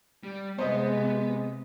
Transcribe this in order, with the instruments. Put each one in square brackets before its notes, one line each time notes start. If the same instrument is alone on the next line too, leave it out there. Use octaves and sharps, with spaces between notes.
[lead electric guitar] G3
[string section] C3 [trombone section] G#3 [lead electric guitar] B3 [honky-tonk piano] C5 D#5